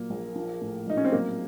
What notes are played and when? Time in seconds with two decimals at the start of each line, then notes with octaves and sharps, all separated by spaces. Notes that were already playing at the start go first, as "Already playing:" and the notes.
Already playing: A#2 F#3 A#3
0.10 A#1
0.36 F3
0.61 A2
0.87 A#1 D#4
0.97 C#4
1.05 C4
1.12 F#3 A#3